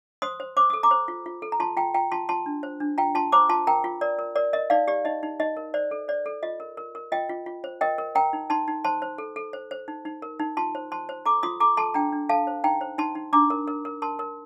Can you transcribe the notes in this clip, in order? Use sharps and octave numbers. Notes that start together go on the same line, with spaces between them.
C5 C6 D#6
C5
C5 D6
A4 D#6
A#5 D6
C5
F4
F4
A4
A#5
F4 A5 C6
F4 G5 A#5
F4 G5 A#5
F4 A5 C6
F4 A5 C6
D4
C5
D4
F4 G5 A#5
F4 A5 C6
C5 A#5 D6
F4 A5 C6
A#4 G5 A#5
F4
A#4 D5
A#4
A#4 D5
A#4 D#5
D#4 D5 F5
G4 D5
D#4 D#5
D#4
D#4 D#5
A#4
C5 D5
A4
C5 D5
A4
F4 D#5
A#4
A#4
A#4
F4 D#5 G5
F4
F4
C5
A#4 D#5 G5
A#4
A#4 G5 A#5
D#4
D#4 A5 C6
D#4
C5 A5 C6
C5
A4
A4
C5
C5
D#4
D#4
A#4
D#4
F4 A5 C6
C5
C5 A5 C6
C5
A4 A#5 D6
F4 C6 D#6
A4 A#5 D6
A4 A5 C6
D4 G5 A#5
D4
A4 F5 A5
C5
D#4 G5 A#5
C5
D#4 A5 C6
D#4
D4 A#5 D6
A#4
A#4
A#4
A#4 A5 C6
A#4